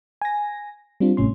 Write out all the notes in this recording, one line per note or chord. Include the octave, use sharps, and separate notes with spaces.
G#5 A#6
G3 C4 D4 F4
G#1 A2 C3 C#4 C6